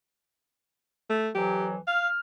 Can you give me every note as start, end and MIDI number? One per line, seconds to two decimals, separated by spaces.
1.10 1.30 57
1.35 1.75 41
1.35 1.75 52
1.35 1.75 54
1.35 1.67 67
1.87 2.08 77
1.87 2.19 89